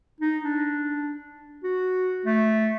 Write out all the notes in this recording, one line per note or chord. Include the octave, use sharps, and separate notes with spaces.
D#4
D4
F#4
A3